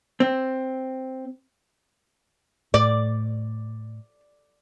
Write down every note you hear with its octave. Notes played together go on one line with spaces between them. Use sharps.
C4
A2 D5